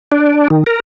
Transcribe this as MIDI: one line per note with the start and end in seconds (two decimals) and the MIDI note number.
0.12 0.48 62
0.50 0.64 51
0.66 0.80 70